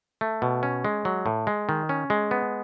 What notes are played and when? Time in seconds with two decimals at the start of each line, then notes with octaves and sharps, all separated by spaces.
0.21 A3
0.42 B2
0.63 C#4
0.85 G#3
1.05 F#3
1.26 A2
1.47 G#3
1.69 D#3
1.89 C#4
2.10 G#3
2.31 B3